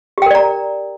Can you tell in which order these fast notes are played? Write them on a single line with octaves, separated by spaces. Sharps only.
G4 G5 A#4 D5 A#5